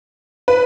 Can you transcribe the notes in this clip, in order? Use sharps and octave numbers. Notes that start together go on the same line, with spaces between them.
B4